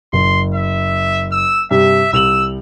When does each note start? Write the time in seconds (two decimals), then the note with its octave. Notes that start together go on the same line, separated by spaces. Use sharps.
0.13 F#1 C6
0.55 E5
1.32 E6
1.71 G2 C3 E5
2.13 C2 E6 F7 F#7